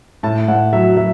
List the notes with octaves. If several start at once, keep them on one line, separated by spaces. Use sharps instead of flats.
A2 A5
A2 F#5
F#3 E5
F#3 E5